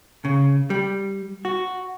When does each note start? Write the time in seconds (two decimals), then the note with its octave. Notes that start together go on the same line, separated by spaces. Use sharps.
0.25 C#3
0.70 G3
1.45 F#4